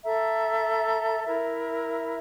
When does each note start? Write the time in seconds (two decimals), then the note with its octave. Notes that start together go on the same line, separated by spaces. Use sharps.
0.04 A4 E5 A#5
1.25 E4 A#4 E5